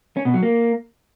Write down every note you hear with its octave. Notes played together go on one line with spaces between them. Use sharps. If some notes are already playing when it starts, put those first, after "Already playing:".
C#4
B2
F#3
A#3